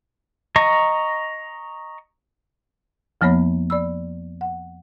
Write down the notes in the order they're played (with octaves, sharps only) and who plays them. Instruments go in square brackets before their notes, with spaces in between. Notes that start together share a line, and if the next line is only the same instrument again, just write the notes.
[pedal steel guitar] D#5 A#5 C#6
[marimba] F2 F3 A#3 B3 C#5 B5
D5 B5 E6
F#5